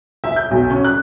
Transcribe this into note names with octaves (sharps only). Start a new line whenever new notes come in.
E5
G6
B1
C#4
F#6